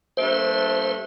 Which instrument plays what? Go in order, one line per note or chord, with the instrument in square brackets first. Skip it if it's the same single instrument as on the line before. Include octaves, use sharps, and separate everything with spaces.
[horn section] G2 A3 A#3 [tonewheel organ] C5